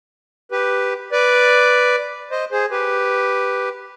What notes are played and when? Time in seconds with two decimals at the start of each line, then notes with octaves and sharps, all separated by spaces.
0.51 G4 B4
1.12 B4 D5
2.31 C5 D#5
2.51 G#4 C5
2.71 G4 B4